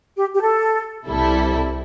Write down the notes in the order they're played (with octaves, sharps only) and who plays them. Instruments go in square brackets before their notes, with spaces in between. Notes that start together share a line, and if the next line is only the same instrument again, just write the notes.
[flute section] G4
G4
A4
[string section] C2 C3 G3 E4 A4